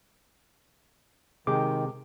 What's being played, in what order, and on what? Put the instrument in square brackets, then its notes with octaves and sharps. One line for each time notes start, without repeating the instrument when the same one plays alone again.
[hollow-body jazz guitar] C3 G#3 G4 [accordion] D#3 [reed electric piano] G#4 D6